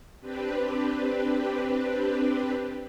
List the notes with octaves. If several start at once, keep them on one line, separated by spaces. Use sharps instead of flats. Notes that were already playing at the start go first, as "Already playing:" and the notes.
C4 D4 G4 B4